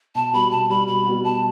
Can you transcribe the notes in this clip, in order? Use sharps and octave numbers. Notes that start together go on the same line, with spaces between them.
B2 A5
G3 B3 F#4 B5
B2 A5
G3 B3 F#4 B5
B2 B5
G3 B3 F#4
B2 A5